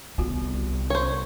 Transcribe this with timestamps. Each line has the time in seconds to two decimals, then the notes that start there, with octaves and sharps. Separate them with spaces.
0.18 C2 D3 B3 F4 F#4
0.90 C5 C#5